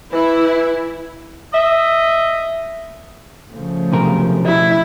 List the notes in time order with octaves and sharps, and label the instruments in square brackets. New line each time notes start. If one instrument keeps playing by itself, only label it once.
[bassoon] E3 [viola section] E4
[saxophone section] D#5 E5
[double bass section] C#3 F3 A3
[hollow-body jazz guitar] B1 C3 A#4
[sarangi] E4